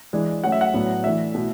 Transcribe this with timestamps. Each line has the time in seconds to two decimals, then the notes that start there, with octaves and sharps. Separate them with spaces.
0.13 E3 G#3 D4
0.44 F#3 A3 C#4 F#5
0.52 E5
0.61 F#5
0.74 A2 F#3 B3 D4
1.04 E3 A3 D4 E5
1.35 B2 A3 E4